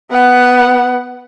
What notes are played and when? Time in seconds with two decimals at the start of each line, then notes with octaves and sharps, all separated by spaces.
0.11 B3 F#5